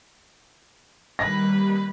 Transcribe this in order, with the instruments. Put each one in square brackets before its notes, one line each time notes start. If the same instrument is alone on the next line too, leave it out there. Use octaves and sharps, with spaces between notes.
[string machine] D#3 G3 A#3 [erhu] B4 [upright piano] A#6